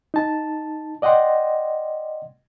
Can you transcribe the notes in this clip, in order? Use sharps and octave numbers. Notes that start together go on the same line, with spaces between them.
D#4 A5
D5 D#5 F#5 G5 C6